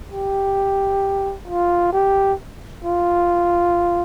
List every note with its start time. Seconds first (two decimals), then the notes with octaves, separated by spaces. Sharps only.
0.12 G4
1.47 F4
1.93 G4
2.84 F4